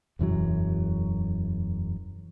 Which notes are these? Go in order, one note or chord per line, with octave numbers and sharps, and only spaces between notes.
E1 F#2 E3 F#3